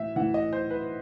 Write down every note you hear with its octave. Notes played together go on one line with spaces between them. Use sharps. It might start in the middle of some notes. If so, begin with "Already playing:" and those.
Already playing: A2 E3 E5
A2 E3 F#5
D#5
C5
B4